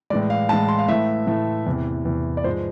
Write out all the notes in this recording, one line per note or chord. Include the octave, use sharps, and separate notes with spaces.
A2 E3 G#3 D5
F5
A2 E3 G#3 A5
C6
F5
A2 E3 A3 E5
A2 E3 A3
E2 C3 E3
E2 C3 E3
D5
G#2 F3 G#3 C5